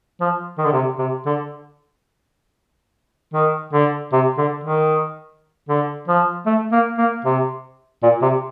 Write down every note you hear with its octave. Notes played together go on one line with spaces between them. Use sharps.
F3
D#3
D3
C3
C3
D3
D#3
D3
C3
D3
D#3
D3
F3
A3
A#3
A#3
C3
A#2
C3